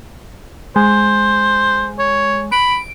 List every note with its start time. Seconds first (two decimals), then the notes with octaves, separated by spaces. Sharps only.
0.76 G#3 C5
1.99 C#5
2.52 B5 D7